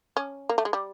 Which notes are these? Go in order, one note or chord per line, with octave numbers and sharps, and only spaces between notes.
C#4
A#3
A3
G#3
G3